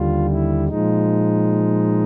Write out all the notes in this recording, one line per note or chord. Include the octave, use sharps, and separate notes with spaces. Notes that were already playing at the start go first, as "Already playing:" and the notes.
Already playing: D#2 D3 G3 F4
E4
A#2 F3 G#3 D#4